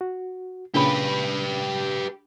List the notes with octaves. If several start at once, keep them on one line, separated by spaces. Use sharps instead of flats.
F#4
A#2 C#3 D4 G4 B4 G#5 B5